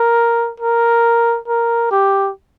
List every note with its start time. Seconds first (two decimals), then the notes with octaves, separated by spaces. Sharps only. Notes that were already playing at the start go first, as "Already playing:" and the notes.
Already playing: A#4
0.60 A#4
1.48 A#4
1.91 G4